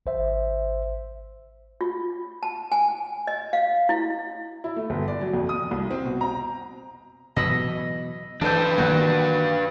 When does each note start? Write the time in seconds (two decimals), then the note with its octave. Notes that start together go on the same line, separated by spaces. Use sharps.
0.06 G#1 C5 E5
1.81 F4
2.43 A5
2.72 G#5
3.27 D#5
3.53 F5
3.89 E4
4.64 E4
4.76 A3
4.90 G1
5.08 D5
5.21 F#3
5.34 F2
5.49 D#6
5.71 C2
5.91 C4
6.05 B2
6.21 A#5
7.37 B2 E3 F#3 D#5 B5 E6
8.41 E3 D4 A4 B4 C5
8.78 D#3 E3 A#3 F#4